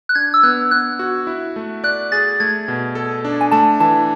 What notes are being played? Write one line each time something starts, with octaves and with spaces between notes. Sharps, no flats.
F#6
D4 G#6
E6
B3 F#6
B3 F#6
F#4
E4
A3
D5 F#6
G#4 A6
A3 G#6
B2
A4
D4
G#5
A3 A5
E3 A5